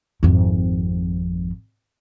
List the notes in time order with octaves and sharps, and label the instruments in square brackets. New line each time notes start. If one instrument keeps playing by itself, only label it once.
[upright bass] G#1 F2